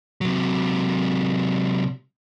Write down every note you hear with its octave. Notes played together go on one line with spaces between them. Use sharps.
C3 F#3